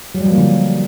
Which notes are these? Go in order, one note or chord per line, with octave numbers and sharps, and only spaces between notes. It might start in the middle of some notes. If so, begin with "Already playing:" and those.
F#3
G3
F3
A#3
D3